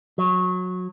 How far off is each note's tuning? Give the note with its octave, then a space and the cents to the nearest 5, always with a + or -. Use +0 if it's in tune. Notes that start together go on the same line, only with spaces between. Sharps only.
F#3 -20